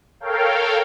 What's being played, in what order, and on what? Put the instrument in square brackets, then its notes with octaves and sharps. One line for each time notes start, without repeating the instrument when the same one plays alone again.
[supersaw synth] A4 A#4 C#5 F5 G5